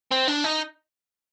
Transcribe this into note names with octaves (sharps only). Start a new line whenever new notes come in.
C4
D4
D#4